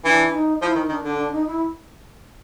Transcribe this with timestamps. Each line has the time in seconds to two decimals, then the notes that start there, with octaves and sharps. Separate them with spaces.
0.04 E3 D4
0.33 D#4
0.61 F3 E4
0.75 D#3 D#4
0.89 D#3 D4
1.04 D3 D4
1.18 D4
1.32 D#4
1.47 E4